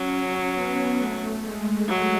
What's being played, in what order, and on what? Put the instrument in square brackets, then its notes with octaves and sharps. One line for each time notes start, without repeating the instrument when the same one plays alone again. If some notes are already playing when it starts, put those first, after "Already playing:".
Already playing: [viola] F#3 [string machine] C#4
[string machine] C#4
B3
A3
G#3
[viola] F#3 [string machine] G#3